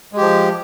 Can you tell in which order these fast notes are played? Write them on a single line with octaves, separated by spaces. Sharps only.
G#3 G4 F3